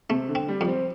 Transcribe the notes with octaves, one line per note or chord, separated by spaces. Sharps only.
C3 A3
D3
C4
G3
F2
C4